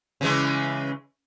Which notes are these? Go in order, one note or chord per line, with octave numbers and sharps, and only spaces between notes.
C#3 E3 G#3